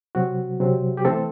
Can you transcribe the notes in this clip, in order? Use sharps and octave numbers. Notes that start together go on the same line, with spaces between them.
C3 F#3 C4 F#4
C3 F#3 C4
G4
E3 A3 C4 A4